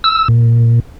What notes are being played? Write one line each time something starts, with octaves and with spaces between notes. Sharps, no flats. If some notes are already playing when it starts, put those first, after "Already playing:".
E6
A#2